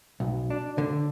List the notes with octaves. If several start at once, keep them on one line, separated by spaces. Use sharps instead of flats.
B1
D4
D3